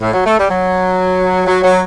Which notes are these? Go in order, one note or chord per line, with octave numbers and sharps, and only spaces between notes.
A2
F#3
A3
G3
F#3
F#3
F#3